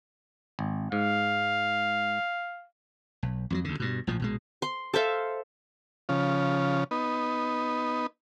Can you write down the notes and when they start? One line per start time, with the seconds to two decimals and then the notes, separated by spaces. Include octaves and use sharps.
0.59 G#1
0.92 G#2 F5
3.23 B1
3.50 F2 F3 F#3
3.64 D2 D3
3.80 G2 B2
4.07 A#1 A2 F3
4.20 A#1 B2 G#3
4.62 C6
4.94 A4 C5 E5 F5
6.09 C#3 F3
6.91 B3 D#4